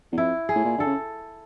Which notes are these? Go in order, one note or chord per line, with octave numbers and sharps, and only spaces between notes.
E2
F2 E4
G#4
A2
A#2
D3 A4
C#3